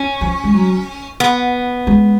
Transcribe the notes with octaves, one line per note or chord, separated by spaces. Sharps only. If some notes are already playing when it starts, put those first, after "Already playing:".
Already playing: C#4
F3
G#3
F#3
B3
G#3